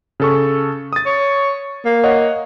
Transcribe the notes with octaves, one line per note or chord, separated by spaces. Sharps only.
C#3 A4 C#6
D#6 A6
C#5
A#3
C#5 D#5 F#5